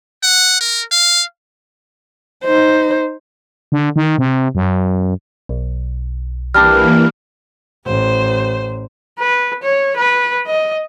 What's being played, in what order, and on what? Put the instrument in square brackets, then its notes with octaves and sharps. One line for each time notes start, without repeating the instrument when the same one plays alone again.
[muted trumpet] F#5
A#4
F5
[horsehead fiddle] D#4 C5
[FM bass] D3
D#3
C3
F#2
[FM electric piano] B1
[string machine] E3 A#3 [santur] G3 D4 D6 [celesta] F6
[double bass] A1 [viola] C5
[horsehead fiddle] B4
C#5
B4
D#5